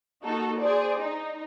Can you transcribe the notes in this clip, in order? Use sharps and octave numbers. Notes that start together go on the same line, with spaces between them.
A#3 D#4 F#4 A4
G#4 C5 D5
D#4